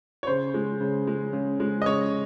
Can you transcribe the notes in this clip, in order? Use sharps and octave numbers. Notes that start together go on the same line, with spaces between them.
C#5
C#3 C5
G#3
C#3
G#3
C#3
G#3
D#5
C#3 C#5